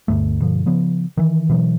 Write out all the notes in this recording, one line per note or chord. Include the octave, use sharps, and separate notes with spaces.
D2 G2 A3
G2 B2 D3 F3
C#3 F3 B3
D#3 E3
B2 E3 F#3